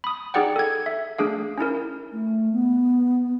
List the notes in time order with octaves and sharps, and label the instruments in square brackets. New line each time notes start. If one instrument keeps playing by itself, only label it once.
[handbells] B5 D#6
D#4 G4 G#4 D5 F#5 G5
A4 G#6
E5
A3 D4 G#4 F5
C#4 D#4 E4 A#4
[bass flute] A3
B3